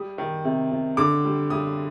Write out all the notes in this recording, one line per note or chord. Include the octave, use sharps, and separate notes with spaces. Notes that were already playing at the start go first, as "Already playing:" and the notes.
Already playing: G3 D#6
D#3
C3
C3
D3 D6
G3
G3 D#6